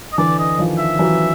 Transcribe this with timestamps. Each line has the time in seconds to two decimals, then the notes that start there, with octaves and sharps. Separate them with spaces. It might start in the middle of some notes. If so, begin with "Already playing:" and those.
0.13 D#5
0.18 D3 E3 D5
0.39 D#5
0.59 D#3 F3
0.79 E5
0.99 E3 F#3